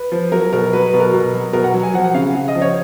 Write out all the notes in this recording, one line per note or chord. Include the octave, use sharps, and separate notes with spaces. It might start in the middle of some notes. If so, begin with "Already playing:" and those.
Already playing: B4
F3
F#3 A#4
B2 A#4
F#3 B4
B4
B2
A#4
B2
F#3
B2 A#4
F#5
F#3
G#5
F3 F#5
F#5
C#3 F5
C#3
D#5
F3
C#5